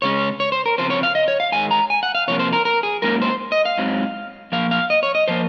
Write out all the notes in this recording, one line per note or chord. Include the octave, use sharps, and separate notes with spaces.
C#3 G#3 C#4 C#5
C#5
C5
A#4
C#3 F3 C4 C5
C#5
F5
D#5
C#5
F5
G#2 D#3 G#3 G#5
A#5
G#5
F#5
F5
C3 F3 A#3 C#5
C5
A#4
A#4
G#4
G#2 F#3 A#3 C#4 A#4
C5
D#5
F5
G#2 F#3 C4
A#2 F3 A#3 F5
F5
D#5
C#5
D#5
F3 A#3 C5